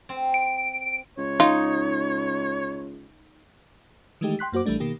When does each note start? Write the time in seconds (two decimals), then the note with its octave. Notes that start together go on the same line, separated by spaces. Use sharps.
0.09 C4
0.34 D7
1.18 C#2 C#5
1.40 D#4 F4
4.21 D#3 E3 G#3 A3 D#4 G4
4.39 G5 C6 F#6 B6
4.52 F#2 A#3 F#4 C5 D6
4.66 A#1 E3 G3 A3 D4
4.80 B2 D#3 A#3 G4